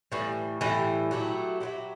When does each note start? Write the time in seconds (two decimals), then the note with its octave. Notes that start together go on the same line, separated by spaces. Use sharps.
0.12 A2 E3 G3
0.61 A2 E3 G3
1.11 F#3 A3 E4 G4
1.60 F#3 A3 E4 G4